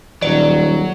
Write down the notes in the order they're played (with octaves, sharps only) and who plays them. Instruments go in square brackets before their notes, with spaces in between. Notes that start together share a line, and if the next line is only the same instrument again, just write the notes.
[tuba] D#1 [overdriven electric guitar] F#3 [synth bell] D5